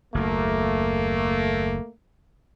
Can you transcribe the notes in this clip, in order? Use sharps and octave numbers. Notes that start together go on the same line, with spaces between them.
F#1 D#2 A3 A#3